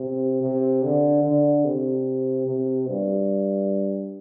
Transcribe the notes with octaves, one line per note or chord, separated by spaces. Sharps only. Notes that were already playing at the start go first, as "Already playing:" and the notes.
Already playing: C3
C3
D3
D3
C3
C3
G2